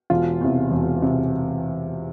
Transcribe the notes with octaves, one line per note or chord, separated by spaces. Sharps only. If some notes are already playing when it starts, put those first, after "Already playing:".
E1 F4
E2 C3
E1
C3